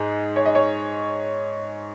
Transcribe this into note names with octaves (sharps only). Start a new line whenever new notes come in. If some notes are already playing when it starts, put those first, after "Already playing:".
Already playing: G#2 G#3 G#4
C#5
D#5
C#5